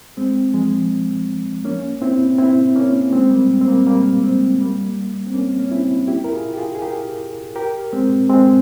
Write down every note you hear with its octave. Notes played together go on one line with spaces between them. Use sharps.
G#3 C4
F3 G#3
A#3 C#4
C4 E4
C4 E4
A#3 C#4
G#3 C4
G3 A#3
C4
G3 A#3
G3 A#3
G#3 C4
G3 A#3
C4
A#3 C#4
C#4
C4 E4
E4 G4
A#4
F4 G#4
G4
F4 G#4
G#4
G4 A#4
G4 A#4
G#3 C4
G#3 C4